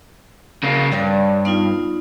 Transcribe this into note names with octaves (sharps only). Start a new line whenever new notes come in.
C#3 A#3
G2 D4 C#5 D5
B3 D#4 F4 F5